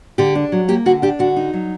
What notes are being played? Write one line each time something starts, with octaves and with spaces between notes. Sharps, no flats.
D3 G4
D4
F#3
A#3 G4
D3 F#4
D4 G4
D3 F#4
D#4
F#3